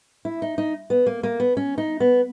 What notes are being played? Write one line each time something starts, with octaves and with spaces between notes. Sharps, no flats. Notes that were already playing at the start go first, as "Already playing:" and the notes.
E4
D#4
D#4
B3
A#3
A#3
B3
C#4
D#4
B3